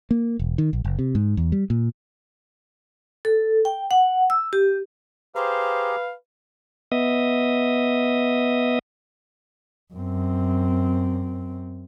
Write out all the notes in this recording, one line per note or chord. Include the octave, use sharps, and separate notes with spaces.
A#3
E1
D#3
A#1
F#1
C3
G#2
E2
G3
A#2
A4
G5
F#5
E6
G4
G4 G#4 B4 C5 F5 A#5
B3 D#5 E5 D#6
F#2 C4